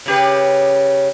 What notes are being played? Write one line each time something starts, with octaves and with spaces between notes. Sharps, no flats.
C#3 G4 B4